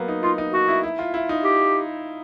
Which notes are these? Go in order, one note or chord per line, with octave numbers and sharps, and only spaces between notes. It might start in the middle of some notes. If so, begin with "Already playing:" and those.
Already playing: F#3 A#3 B3
D#4
D#4 F4
D#4
D#4 F#4
E4
E4
F4
E4
D#4
G4